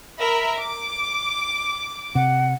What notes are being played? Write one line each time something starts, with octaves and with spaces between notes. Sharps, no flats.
A#4 E5 B5
D6
C3 F#5